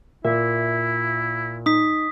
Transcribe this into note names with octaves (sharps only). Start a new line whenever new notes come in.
A#2 E4 E5
D#4 D#6 B6